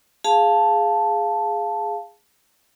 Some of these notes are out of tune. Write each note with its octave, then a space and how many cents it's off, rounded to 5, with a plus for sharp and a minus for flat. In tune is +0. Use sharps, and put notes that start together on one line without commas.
G#4 +0 F5 +0 A5 +0